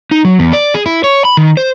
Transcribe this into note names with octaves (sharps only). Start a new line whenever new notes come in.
D#4
F#3
E2
D5
G#4
E4
C#5
B5
D#3
C5